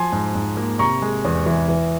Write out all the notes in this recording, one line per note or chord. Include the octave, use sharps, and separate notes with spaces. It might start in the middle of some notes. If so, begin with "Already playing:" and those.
Already playing: F3 G#5 C6
G#2
G#2
A#3
C3 A#5 C#6
G#3
E2
E3
E3